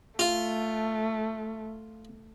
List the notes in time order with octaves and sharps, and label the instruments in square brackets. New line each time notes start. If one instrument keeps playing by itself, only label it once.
[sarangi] A3 [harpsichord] F4